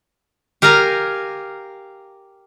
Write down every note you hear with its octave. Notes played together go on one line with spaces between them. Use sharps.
G4 A#4 F5 G#5 A#5